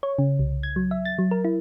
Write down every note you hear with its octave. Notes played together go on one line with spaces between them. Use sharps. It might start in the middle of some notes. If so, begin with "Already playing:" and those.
C#5
C#3
C2
G#6
F#3
E5
A6
F#3
A#4
E4